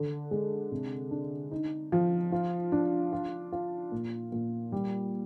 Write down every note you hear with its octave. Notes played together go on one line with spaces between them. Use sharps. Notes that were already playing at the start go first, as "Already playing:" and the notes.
Already playing: D3
G#3
C3
D4
D#4
F3
F4
D4
F4
F4
A#2
A#2
G3